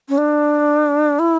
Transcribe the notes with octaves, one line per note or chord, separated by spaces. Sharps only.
C#4
D4
E4